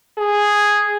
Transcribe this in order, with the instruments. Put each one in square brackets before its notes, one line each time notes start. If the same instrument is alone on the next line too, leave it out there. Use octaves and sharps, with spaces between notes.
[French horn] G#4